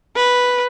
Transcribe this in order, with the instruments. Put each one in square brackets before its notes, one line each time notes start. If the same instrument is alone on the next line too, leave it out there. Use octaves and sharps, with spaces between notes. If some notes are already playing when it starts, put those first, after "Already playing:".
[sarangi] B4